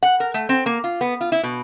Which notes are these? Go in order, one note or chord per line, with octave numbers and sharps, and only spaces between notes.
F#5
A#4
A3
C4
A#3
F4
B3
F4
E4
B2